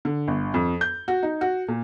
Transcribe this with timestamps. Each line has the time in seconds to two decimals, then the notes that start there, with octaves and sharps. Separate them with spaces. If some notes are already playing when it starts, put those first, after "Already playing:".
0.05 D3
0.28 G1
0.54 F2
0.81 G6
1.08 F#4
1.23 D#4
1.41 F#4
1.68 A#2